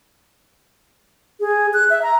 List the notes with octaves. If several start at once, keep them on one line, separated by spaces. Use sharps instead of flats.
G#4
F#6
E5
A#5